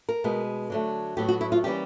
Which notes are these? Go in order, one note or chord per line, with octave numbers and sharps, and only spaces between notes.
A#4
B2 G#3 B3
D3 F#3 A3
A2 F#3 B3 G4
F#4
E4
F4
E3 G3 A#3 C#4 G4